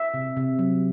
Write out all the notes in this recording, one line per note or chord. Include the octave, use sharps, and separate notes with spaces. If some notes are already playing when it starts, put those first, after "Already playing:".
Already playing: E5
C3
C3
F#3